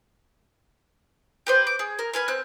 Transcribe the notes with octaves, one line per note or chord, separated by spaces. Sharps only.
G4 B4 C5
D6
G#4
A#4
B4 G#5 F6
C4 F#6